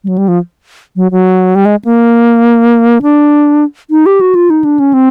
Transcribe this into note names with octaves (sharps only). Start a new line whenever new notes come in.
G3
F#3
G3
F3
F#3
F#3
G3
G#3
A#3
D4
D#4
G4
F#4
F4
D#4
D4
C#4
C4